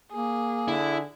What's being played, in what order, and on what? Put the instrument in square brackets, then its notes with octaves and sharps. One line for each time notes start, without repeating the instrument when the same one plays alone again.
[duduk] A#3 [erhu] G#4
[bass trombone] D3 [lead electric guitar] E4